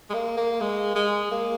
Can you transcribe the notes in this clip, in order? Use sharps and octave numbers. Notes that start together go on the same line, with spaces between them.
G#3
A#3
A#3
G#3
G#3
A#3